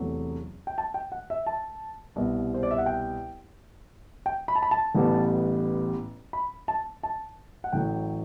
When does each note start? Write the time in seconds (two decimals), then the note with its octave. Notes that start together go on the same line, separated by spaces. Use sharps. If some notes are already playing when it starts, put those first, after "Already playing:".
Already playing: E2 C3 F#3 A3
0.67 G5
0.78 A5
0.94 G5
1.12 F#5
1.30 E5
1.46 A5
2.16 C2 B2 G3 B3
2.54 C5
2.63 D5
2.71 E5
2.78 F#5
2.86 G5
4.26 G5
4.48 B5
4.55 A5
4.63 B5
4.71 A5
4.95 A1 A2 G3 B3
6.33 B5
6.68 A5
7.03 A5
7.64 F#5
7.72 A1 A2 F#3 G5